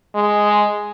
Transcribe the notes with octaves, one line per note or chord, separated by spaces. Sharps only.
G#3